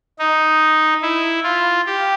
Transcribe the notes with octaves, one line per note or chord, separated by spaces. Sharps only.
D#4
E4
F4
G4